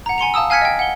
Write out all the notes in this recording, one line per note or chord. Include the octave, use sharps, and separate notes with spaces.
F#5 A#5
G#5 C6 C#7 F7
F5 A5 D#6 E6
F5 G#5 F6 G#6 B6 C#7
D#5 G5
F#5 G7